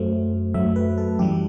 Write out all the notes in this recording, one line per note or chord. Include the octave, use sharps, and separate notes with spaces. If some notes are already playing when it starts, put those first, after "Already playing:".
Already playing: F#2 F#3 A3 C5
F#2 F#3 A3 E5
B4
A4
F#2 E3 G3 G4